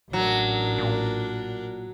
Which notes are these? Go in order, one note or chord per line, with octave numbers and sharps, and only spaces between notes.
A1 F#3 D4 A#4
A#2